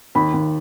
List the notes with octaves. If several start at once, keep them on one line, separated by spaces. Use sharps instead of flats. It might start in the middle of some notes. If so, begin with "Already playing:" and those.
D#2 B5
D#2